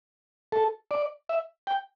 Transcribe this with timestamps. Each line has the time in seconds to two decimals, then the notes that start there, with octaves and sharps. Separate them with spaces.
0.52 A4
0.91 D5
1.29 E5
1.67 G5